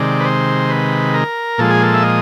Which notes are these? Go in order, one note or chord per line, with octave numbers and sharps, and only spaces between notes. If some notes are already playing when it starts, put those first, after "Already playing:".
Already playing: C3 D#3 G#3 D5
B4
C5
B4
A#4
A#2 F3 G#3 A4
G#4
A4
E5
D#5